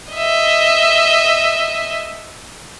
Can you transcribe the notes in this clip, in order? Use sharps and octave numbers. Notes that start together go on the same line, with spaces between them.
D#5 E5